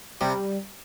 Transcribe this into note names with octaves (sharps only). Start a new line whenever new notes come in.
C3 G3